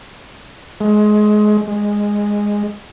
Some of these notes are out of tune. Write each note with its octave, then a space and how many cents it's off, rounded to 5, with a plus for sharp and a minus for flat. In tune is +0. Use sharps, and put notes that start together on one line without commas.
G#3 +20
G#3 -10